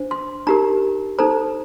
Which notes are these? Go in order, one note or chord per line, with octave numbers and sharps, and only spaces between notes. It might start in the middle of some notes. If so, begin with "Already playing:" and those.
Already playing: D4 C5
C6
D#4 G4 A#4 A#5
D#4 A4 C5 A#5